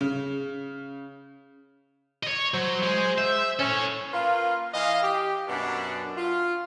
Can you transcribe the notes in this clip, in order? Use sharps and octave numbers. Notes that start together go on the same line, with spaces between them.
C#3
C#5 D#5
F#3 C5
G#3 G#4
E5
C#4 A4 C#5
A#3 F4 B4
E3 D#5 F5
G4
F#2 B2 D4
F4